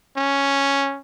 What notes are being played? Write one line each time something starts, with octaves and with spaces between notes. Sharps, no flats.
C#4